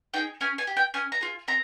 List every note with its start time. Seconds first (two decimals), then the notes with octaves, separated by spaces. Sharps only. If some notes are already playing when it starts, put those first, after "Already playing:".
0.14 D#4 G#4 G5
0.41 C#4 G#5
0.58 G#5
0.67 G4
0.77 G5
0.94 C#4 G#5
1.12 A#5
1.21 F4 G#4
1.48 C4 A#5